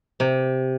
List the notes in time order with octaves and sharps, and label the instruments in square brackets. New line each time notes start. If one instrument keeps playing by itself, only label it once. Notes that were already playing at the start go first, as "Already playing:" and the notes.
[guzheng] C3